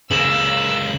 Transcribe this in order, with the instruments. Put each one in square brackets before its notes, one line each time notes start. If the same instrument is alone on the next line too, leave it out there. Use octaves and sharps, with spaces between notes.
[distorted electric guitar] C#2 A#3 [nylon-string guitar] C#3 [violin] E6 [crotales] E7 F#7